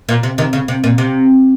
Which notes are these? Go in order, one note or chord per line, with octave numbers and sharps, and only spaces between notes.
A#2
C3
C3 D#3
C#3
C3
A#2
C3